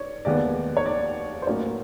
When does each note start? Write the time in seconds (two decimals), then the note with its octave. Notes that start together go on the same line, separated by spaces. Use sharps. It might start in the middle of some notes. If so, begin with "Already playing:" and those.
Already playing: C#5 D5
0.25 F1 D#2 D#3 G#3 B3 D5
0.77 C#5
0.86 D5
1.42 C5
1.47 A2 F#3 A#3 C#4 C#5